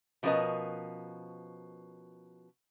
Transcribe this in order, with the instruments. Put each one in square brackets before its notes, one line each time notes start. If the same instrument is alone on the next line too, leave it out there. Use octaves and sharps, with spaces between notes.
[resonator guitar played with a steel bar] B2 F3 C#4 A#4 B4 D#5